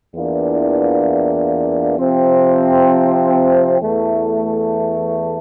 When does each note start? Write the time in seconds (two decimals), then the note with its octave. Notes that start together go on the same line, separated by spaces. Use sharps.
0.15 E2 E3 A#3 D4 F4
1.97 C3 F3 C4
3.80 E2 E3 A3